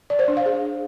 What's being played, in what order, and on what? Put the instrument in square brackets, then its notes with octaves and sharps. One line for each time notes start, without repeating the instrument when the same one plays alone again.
[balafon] D5
C5
D4
F5
G#4